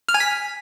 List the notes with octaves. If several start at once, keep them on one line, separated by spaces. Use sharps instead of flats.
F6
G#5
B6